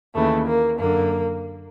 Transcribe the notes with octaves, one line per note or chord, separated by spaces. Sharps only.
D#2 C#3 E3 A3
A#3
F#2 D3 A#3